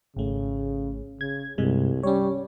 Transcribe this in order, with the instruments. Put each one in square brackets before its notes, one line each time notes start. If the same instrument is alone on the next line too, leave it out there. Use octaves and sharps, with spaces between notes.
[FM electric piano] G#1 A3 [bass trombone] C#3
[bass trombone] C#3 [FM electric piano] G#6
[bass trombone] C2 [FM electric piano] G2 C3 G#3
[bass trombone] G3 [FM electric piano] C#4 C#5